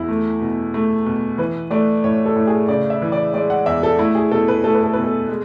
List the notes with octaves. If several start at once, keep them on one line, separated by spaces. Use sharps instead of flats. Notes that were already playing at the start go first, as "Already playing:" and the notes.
Already playing: E2 E4
A3
B2
A3
B2
E3 B4
A3 D5
A2 C#5
A4
A2
G#4
C#3 D5
E5
E3
D5
G#3 D5
F#5
E2 E5
A4
A3 E4
G#4
B2 A4
B4
A3 A4
B4
A4
B2 B4
A4
G#3